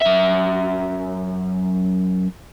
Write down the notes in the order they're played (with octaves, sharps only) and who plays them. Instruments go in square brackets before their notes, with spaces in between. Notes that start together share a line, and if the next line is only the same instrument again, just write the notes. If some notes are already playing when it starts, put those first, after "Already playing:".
[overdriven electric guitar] F#2 E5